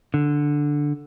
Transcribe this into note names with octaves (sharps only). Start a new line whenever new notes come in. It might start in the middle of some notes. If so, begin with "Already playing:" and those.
D3